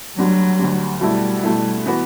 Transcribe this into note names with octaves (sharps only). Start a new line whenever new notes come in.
D2 D3 F#3 G3
D2 D3 G3
B2 G3 A3 E4
B2 A3 E4
E3 B3 F#4 B4